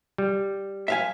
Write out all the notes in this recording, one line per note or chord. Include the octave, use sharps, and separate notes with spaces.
G3
E5 F5 G#5